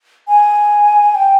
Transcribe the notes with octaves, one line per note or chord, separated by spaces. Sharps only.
G#5
G5